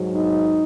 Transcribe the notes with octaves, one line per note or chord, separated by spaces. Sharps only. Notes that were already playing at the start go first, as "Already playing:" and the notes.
Already playing: G#2 F#3
D#4